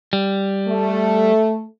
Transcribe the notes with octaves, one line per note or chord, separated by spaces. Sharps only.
G3
A3